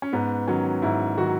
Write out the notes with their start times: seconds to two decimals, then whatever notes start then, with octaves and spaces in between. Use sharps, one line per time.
0.02 C#4
0.13 G#2 B3
0.48 D#3 F#3 C#4
0.82 G#2 E4
1.18 D#3 F#3 F#4